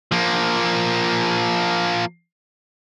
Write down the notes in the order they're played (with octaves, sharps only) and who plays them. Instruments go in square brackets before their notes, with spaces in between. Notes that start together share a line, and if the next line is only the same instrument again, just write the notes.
[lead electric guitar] F3 A#3